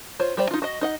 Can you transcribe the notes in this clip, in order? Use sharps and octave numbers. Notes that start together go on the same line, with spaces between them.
F4 C5 C#5
G3 G4 C5 D5
D#4 F4
F#4 D#5
D#4 D#5 F#5